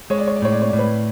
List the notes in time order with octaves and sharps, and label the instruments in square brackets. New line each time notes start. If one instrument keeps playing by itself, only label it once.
[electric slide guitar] G#3 [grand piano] C#5
[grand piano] D5
C#5
D5
[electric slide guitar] A2 [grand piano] C#5
[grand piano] D5
C#5
D5
[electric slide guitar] A2
[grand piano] B4 C#5